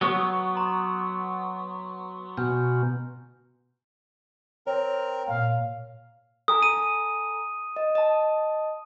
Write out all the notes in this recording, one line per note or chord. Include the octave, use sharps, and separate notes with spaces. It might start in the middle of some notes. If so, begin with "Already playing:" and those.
F#3 B3 C#6
A#5 C6
B2 G#5 F6 G6
C4 A#4 C#5
A#2 F5
A4 G#5 A#5 D#6
D#7
D#5
D#5 A5